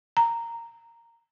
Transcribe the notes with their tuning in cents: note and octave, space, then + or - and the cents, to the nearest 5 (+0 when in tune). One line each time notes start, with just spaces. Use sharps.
A#5 -10